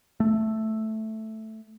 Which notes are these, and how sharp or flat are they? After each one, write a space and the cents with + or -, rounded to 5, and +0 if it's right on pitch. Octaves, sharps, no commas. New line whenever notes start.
A3 +0